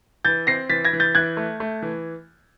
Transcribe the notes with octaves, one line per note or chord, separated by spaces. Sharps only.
E3 G6 A6
C4 A#6 C7
E3 A6 B6
G#6 A#6
E3
G6 A6
E3 F#6 G#6
A3
A3
E3